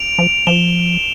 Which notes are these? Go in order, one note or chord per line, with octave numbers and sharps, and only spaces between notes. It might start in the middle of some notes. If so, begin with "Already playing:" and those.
Already playing: D7 F7
F3
F3 E7 G7